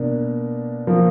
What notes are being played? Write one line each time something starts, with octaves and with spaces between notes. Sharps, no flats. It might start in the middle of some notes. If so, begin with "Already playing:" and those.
Already playing: B2 A#3 D4
F3 A#3